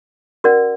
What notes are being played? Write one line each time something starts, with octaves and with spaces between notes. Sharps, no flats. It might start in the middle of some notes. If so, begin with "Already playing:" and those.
C#4 F#4 A#4 D5 F#5